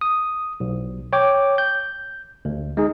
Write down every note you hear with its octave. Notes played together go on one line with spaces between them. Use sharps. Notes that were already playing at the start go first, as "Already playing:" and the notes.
D#6
B1
C#5 G5 D6
G6
D2
G#3 D#4 G#4